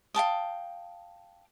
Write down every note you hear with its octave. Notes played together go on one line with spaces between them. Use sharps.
F5 G5 A5 D#6